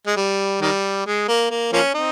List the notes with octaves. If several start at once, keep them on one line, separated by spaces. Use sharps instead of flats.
G#3
G3
D#3 G3
G#3
A#3
A#3
F3 A#3 C#4
C4 D#4